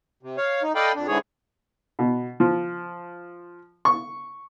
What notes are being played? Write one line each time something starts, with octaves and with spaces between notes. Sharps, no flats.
C3
C#5 F5
D#4
A4 D5 D#5 F5 G5 B5
F2 D4
G#2 D3 E3 G#4 C#5
B2
F3
C#6